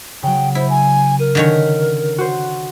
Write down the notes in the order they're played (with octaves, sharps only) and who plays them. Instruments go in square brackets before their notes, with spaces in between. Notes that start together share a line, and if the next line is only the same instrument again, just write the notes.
[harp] C#3 F#3 [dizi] G5
[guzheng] E4 [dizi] C5
[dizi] G#5
[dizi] A#4 [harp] D#7
[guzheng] D3 D#3 C#5 [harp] C#4 D#5 B6
[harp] F#4 C5